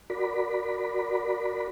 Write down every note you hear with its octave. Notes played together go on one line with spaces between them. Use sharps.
F#4 A#4 D5 B5